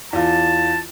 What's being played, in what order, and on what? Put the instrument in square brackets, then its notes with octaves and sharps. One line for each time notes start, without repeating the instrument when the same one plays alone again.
[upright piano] E2 F4 [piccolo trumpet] A5